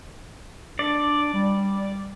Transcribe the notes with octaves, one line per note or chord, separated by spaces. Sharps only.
D4 D5
G3